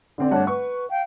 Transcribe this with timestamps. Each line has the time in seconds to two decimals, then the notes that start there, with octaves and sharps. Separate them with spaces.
0.18 D3 C4 D5
0.31 G2 A3 D4 C#5 F#5 A5
0.47 B4 C#6
0.89 F5 G5